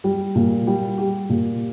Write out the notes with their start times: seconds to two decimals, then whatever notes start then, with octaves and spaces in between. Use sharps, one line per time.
0.04 G3
0.35 A#2
0.67 G3
0.98 G4
1.29 A#2